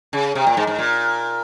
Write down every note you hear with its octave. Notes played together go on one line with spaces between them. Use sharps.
C#3
C3
A#2
G#2
G#2
A#2